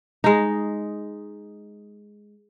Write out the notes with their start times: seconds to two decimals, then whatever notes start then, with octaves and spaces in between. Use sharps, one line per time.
0.24 G#3 D#4